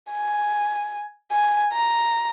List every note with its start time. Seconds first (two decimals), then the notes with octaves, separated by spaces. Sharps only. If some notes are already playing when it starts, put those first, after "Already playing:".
0.11 G#5
1.32 G#5
1.73 A#5